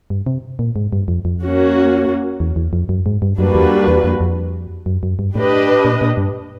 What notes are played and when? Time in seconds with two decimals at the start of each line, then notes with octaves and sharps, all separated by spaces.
0.10 G2
0.26 C3
0.59 A#2
0.76 G#2
0.93 G2
1.08 F2
1.25 F2
1.41 A#3 C#4 F#4
2.40 E2
2.56 E2
2.73 F2
2.89 F#2
3.06 G#2
3.22 G2
3.38 F#2 G3 A#3 D4 F#4 B4
3.55 E2
3.88 E2
4.04 F2
4.21 F2
4.86 F#2
5.03 F#2
5.19 G2
5.36 A2 D4 G4 B4 D#5
5.85 A#2
6.01 A#2
6.17 G2